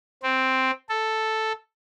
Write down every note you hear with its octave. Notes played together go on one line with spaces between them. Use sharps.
C4
A4